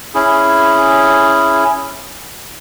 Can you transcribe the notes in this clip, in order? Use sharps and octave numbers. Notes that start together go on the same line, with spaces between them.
C#4 E4 G#4